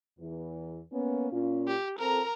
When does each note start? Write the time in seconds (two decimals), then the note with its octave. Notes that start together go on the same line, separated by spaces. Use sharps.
0.19 E2 E3
0.92 A#3 B3 C#4
1.32 A#2 C#4 F4
1.67 G4
1.99 C4 F4 A4 A#4 A#5